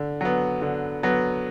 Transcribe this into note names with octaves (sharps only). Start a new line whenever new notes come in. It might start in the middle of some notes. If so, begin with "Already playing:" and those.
Already playing: D3
F#3 B3
D3
F#3 B3